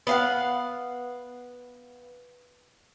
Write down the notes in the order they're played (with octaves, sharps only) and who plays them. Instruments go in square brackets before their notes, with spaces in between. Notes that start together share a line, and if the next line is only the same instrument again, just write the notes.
[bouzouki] B3 F5 F#5